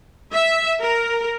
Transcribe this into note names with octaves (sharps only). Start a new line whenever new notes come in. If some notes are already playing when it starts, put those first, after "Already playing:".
E5
A#4